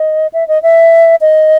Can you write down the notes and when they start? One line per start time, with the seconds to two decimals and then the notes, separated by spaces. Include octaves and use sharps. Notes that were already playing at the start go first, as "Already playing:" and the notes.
Already playing: D#5
0.33 E5
0.48 D#5
0.63 E5
1.21 D#5